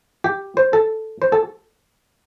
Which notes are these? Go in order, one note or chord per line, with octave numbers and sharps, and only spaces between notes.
G4
C5
A4
C5
A4